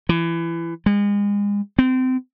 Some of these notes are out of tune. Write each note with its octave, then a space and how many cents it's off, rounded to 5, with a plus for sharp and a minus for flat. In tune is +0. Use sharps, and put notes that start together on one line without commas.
E3 +25
G#3 -35
C4 -30